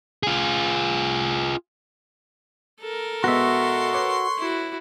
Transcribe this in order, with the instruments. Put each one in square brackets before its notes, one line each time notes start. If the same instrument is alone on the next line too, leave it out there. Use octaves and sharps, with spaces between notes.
[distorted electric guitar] F4 G#4
[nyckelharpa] A4 A#4
[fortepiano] B2 G#3 B3 [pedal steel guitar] F#4 E5 [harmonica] C6 C#6
[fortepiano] B4 C#5 D6
[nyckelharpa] E4 F#4